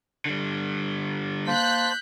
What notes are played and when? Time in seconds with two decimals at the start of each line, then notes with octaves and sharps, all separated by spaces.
0.26 D3 G3
1.47 A#3 C5 A5 F#6 G6 B6